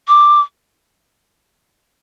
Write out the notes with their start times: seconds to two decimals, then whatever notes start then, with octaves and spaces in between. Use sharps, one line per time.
0.08 D6